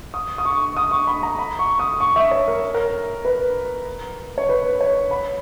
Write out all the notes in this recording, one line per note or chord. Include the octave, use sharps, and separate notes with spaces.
D#6
D#6
C#6
D#6
C#6
B5
A#5
B5
C#6
D#6
C#6
E5
C#5
A#4
A#4
B4
C#5
B4
C#5
B5